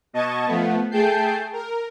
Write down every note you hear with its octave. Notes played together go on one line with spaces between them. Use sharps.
B2 D#5 A5 C#6 G#6
F3 A3 B3
A3 G#4 G5 A5 G6 C7
A#4